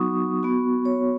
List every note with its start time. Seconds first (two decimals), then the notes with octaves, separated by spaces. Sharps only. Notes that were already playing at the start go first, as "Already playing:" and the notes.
Already playing: F#3 B3 D#4 F#4 C#6 D#6
0.43 B3 F#4
0.85 C#5